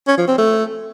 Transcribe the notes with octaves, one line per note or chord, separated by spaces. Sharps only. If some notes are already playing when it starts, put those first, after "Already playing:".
C#4
F3
C4
A3